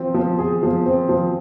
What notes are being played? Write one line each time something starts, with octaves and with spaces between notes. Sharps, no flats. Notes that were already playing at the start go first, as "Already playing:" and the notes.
Already playing: F3 C4
F3
G#4
F3
C4
F3